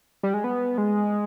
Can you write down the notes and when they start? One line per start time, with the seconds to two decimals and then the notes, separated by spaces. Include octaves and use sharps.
0.23 G3
0.34 G#3
0.44 B3
0.78 G#3